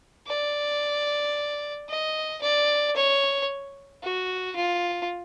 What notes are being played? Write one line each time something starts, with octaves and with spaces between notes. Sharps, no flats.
D5
D#5
D5
C#5
F#4
F4